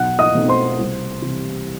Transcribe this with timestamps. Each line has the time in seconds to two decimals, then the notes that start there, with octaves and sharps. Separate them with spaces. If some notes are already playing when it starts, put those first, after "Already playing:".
Already playing: B1 F#5 F#6
0.19 D#5 D#6
0.34 B2 A3 C4 D#4
0.48 C5 C6
0.79 C2
1.22 C3 E3 G3